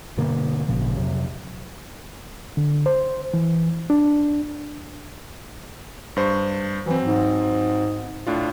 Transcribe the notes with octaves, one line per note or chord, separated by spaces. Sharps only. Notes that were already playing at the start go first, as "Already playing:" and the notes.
G2 B2 D3 A#3
G#1 A#2 C#3 F3
F2 C3 F#3
D3
C5
E3
D4
G2 C5 C#6
E3 F#3 C4
G#2
A2 D4 F4